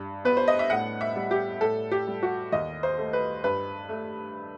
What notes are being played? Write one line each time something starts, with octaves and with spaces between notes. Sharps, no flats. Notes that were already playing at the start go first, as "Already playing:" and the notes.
Already playing: G2
B3 B4
C5
D#5
E5
A2 F#5
E5
G3
G4
A2 A4
G4
G3
F#4
D#2 D#5
C5
A3
B4
G2 B4
A3